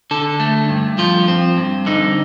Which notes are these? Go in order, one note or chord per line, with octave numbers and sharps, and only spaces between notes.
D3 A4
A3
G2
F3 F4
C4
G2
D3 D#4